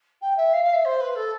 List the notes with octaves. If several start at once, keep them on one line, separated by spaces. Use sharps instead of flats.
G5
E5
F5
F5
E5
C5
B4
A4